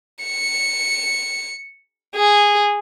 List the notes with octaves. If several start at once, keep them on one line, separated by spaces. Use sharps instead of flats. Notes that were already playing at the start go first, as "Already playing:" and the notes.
C#7
G#4